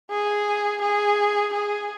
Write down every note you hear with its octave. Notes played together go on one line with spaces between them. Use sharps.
G#4
G#4
G#4